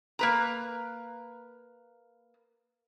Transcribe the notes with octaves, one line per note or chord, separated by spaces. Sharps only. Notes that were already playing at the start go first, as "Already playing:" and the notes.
A#3 B4 A#5